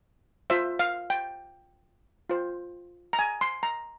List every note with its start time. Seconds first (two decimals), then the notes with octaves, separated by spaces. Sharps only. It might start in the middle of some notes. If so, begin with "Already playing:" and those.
0.50 F4 C5 E5
0.79 F5
1.10 G5
2.29 F4 C5
3.13 A#5
3.19 G#5
3.41 C6
3.63 A#5